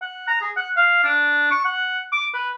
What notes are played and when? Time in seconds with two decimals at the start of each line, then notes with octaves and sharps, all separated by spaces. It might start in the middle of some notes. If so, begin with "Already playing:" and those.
0.02 F#5
0.27 A#5
0.42 G#4
0.57 F#5
0.77 F5
1.04 D4
1.51 C#6
1.65 F#5
2.12 D6
2.34 B4